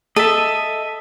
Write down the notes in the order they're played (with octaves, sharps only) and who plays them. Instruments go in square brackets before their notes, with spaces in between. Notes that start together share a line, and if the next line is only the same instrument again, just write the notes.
[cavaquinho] A4 [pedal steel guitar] D#5 E5